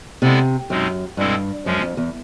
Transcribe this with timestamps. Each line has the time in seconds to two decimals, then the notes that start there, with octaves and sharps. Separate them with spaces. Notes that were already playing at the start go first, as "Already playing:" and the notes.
0.22 C3 G#3 B3 E4 A4 D5
0.70 F#2 B2 G#3 C4 D#4
1.17 G2 B2 G#3 C4 E4 A4
1.65 F#2 F3 G#3 C#4
1.82 F2
1.97 E2